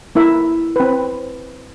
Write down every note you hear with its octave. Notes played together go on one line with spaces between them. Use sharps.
A#3 E4 A#4 E5
C4 B4